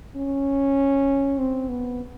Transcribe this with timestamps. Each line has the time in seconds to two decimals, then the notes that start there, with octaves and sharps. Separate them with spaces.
0.16 C#4
1.38 C4
1.69 B3